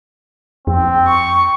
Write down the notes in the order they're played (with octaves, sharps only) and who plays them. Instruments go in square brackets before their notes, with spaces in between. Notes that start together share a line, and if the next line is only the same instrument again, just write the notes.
[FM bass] F2 [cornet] C4
[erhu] C#6